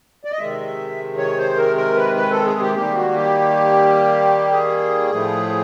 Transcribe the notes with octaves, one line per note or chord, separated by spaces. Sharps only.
D5
D#5
C3 D#3 G#3 E5
C#5
C5
A#4
A#4
B4
B4
A4
G#4
G4
D#3 G3 A#3 G4
F#4
G4
G#4
A2 F3 A3